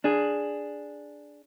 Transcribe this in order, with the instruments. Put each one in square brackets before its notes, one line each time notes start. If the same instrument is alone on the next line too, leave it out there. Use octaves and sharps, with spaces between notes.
[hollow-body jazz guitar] D4 G#4